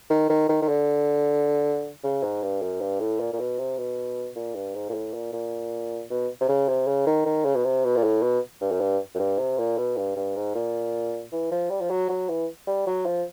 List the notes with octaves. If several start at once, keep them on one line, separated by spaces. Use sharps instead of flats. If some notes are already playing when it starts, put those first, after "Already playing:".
D#3
D#3
D#3
D#3
D3
C#3
G#2
G2
F#2
G2
A2
A#2
A#2
B2
C3
B2
A#2
G2
G#2
A#2
A2
A#2
A#2
B2
C3
C#3
C3
C#3
D#3
D#3
C#3
B2
C3
B2
A#2
A2
B2
G2
F#2
G2
F#2
G2
C3
A#2
B2
G2
G2
G#2
A#2
E3
F3
G3
F3
F#3
F#3
E3
G3
F#3
F3